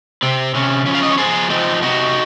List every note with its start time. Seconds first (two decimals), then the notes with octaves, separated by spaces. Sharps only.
0.22 C3 C4
0.55 C3 C#4
0.86 F3 C#4
0.95 F5
1.03 D#5
1.10 C#5
1.18 F3 G#4 C5
1.50 F3 C4 D#4
1.82 C3 D#4 F#4